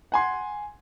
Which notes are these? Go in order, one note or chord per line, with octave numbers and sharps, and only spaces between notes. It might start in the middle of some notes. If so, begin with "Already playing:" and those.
F#5 G#5 C6